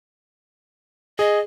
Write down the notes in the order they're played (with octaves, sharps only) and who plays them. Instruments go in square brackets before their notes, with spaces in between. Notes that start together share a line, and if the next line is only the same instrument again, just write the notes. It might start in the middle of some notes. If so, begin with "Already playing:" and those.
[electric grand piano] G#4 [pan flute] D#5